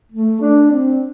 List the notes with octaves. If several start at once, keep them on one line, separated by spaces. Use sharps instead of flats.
A3
D4
C4